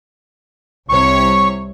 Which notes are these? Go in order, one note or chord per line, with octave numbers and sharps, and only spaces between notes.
C2 C3 C#5 C#6